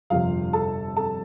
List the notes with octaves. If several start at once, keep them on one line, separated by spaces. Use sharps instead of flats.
G1 F2 C3 F4 F5
A4 A5
A4 A5